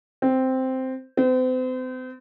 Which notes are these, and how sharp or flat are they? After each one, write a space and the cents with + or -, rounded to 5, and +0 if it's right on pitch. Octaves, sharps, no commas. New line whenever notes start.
C4 -5
C4 -40